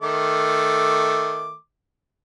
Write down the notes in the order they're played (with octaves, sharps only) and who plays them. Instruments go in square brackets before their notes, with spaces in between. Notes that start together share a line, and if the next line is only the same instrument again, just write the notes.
[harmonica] D#3 A3 D6